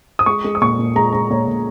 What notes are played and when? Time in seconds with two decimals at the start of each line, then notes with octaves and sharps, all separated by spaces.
0.19 D#6
0.26 G#3 C#6
0.44 G#3
0.55 D#6
0.61 A#2 C#6
0.79 A#2
0.96 G#3 A#5
1.13 G#3 A#5
1.30 A#2 C#5
1.47 A#2